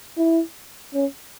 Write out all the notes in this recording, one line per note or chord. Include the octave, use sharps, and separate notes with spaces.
E4
C#4